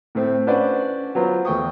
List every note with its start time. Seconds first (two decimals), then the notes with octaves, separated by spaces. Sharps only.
0.15 A2 A3 C4
0.47 C#4 D4 B4 C5 D5 F#5
1.15 F#3 B3 F4 C5
1.45 E2 A3 G5 C#6 D#6